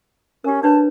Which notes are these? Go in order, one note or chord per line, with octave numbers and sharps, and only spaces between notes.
C#4 G4 A#4
D4 B4 C#5 A5